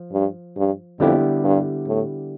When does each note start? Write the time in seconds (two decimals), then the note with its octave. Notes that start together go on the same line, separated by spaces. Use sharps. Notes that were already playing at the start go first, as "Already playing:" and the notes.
Already playing: F3
0.12 G2
0.57 G2
1.00 F2 D3 G3 B3 E4 G4
1.44 G2
1.87 A2